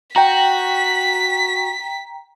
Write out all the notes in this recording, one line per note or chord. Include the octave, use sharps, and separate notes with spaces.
F#4 G5 A#5 B6